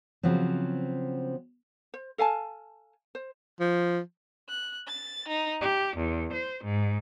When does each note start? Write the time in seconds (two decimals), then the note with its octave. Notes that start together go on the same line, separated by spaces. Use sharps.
0.23 C#3 F3 F#3 B3 C4
1.94 C5
2.18 A4 F5 G#5 A5
3.15 C5
3.60 F3
4.48 F#6
4.87 A6
5.28 D#4
5.61 G4
5.98 E2
6.34 C5
6.65 G#2